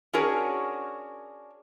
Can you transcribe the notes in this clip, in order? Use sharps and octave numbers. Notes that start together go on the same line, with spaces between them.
C#4 D4 F#4 G#4 A#4 C#5